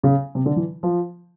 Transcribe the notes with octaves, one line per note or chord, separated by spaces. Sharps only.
C#3
C3
D3
E3
F3